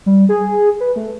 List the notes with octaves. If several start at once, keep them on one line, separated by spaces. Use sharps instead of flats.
G3
G#4
B4
A3